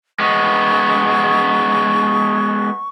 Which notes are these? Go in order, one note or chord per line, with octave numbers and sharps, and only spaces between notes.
G#3 B3 C#6